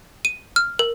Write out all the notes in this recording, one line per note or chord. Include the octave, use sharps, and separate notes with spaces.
D#7
F6
A#4